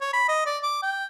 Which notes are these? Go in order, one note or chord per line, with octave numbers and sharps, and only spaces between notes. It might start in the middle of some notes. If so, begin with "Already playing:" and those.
C#5
B5
D#5
D5
D6
G5